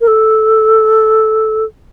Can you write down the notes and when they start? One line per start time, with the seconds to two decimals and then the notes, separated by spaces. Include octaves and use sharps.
0.01 A#4
0.07 A4